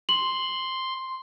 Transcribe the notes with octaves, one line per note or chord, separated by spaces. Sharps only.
C6 F#7